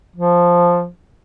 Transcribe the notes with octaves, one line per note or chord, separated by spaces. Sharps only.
F3